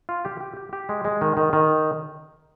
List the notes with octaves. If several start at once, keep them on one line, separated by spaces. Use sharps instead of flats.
F4
G4
G4
G4
G4
G#3
G#3
D#3
D#3
D#3